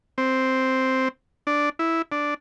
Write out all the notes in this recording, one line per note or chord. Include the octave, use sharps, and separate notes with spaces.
C4
D4
E4
D4